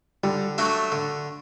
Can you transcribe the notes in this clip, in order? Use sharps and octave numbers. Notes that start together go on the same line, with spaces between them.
D3 G3
F#3 A3 D4 F#4
D3